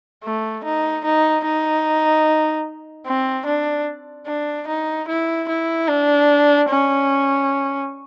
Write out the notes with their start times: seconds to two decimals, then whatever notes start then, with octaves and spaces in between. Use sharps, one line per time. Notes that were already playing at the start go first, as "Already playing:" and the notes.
0.24 A3
0.64 D#4
1.05 D#4
1.45 D#4
3.06 C4
3.46 D4
4.27 D4
4.68 D#4
5.08 E4
5.49 E4
5.89 D4
6.69 C#4